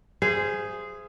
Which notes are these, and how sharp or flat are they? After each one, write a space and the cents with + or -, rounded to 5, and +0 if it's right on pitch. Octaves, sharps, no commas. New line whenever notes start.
G#4 +0 C5 -15 E5 +45